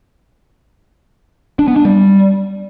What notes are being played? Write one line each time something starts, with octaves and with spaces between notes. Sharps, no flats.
D4
B3
D4
G3